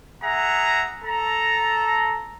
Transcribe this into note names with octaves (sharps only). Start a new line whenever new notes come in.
G#4 E5 F#5 A#5
A4 A#5